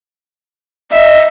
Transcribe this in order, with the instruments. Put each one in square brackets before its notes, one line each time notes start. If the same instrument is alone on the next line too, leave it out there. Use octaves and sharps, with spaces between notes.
[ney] D#5 [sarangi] E5